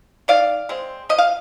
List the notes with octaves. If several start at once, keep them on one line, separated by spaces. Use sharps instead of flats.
D#3 D5 F5
G#3 C4
F3 D#5
F5